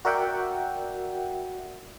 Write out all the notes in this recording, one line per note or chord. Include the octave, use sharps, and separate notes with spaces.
F#4 A#4 D5 E5 F#5 G5